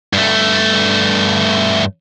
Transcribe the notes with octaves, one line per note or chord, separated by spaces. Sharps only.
G2 A3